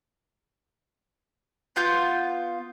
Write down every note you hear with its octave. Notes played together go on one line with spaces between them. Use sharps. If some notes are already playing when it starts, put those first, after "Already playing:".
B3 F4 G6